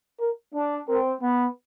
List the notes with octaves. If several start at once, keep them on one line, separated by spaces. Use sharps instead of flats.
A#4
D4
C4 A#4
B3